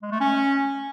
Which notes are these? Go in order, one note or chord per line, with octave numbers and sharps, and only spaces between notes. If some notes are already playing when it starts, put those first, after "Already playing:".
G#3
A3
C#4